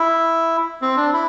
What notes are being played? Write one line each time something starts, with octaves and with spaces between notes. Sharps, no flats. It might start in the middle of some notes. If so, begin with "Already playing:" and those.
Already playing: E4
C4
D4
E4